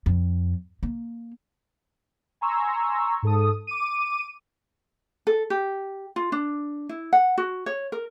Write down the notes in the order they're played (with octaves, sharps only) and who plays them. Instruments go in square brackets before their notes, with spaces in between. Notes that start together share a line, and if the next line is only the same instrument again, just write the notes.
[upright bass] F2
A#3
[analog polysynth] G#5 A#5 C6 C#6 E6
G#2 A4 D#6
D6 D#7
[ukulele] A4
G4
F4
D4
E4
F#5
F#4
C#5
A#4